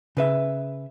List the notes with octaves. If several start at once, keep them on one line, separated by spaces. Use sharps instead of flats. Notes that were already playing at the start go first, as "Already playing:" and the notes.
C#3 B4 E5